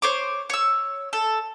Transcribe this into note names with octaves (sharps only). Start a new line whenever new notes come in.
C5 C#5 D6
C#5 E6
A4